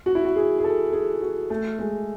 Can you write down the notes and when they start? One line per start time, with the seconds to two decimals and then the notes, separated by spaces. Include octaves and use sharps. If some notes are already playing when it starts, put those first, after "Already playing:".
0.06 F#4
0.15 E4
0.25 F#4
0.36 G#4
0.59 G#4
0.64 A4
0.93 G#4
1.21 F#4
1.50 A3
1.79 G#3